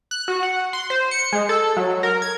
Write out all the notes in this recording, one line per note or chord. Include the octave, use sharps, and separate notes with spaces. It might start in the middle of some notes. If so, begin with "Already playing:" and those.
F#6
F#4
F#5
C6
C5
C#7
G#3
A4
F#3
A#4
G#6